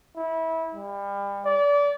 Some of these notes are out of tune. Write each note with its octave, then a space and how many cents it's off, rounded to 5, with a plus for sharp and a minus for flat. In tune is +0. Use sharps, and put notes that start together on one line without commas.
E4 -25
G3 +30
D5 -30